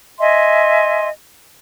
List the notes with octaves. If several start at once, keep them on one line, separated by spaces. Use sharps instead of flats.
D#5 E5 G#5 C6